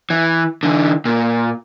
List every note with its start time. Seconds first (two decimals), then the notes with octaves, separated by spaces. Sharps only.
0.10 E3
0.63 D3 E3
1.05 A#2